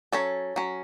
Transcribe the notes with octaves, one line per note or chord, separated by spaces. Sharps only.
F#3 C#4 A4 C#5
F#3 C#4